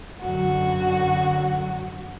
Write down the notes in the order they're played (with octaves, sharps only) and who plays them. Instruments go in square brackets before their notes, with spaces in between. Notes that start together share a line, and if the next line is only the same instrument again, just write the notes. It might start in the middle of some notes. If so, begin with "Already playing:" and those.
[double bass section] F#2 D3 F#3 [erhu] F#4